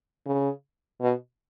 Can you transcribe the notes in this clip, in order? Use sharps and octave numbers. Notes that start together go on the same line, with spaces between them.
C#3
B2